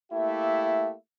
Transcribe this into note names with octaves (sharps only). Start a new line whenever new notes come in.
A3 A#3 E4 G4 E5